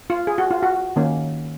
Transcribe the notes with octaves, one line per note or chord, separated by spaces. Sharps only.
F4
G#4
F#4
F4
F#4
D#3 A#3 C#4